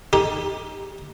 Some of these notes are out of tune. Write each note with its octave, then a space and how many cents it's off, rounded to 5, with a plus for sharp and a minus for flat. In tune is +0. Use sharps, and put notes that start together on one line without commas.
D#4 +10 G4 +0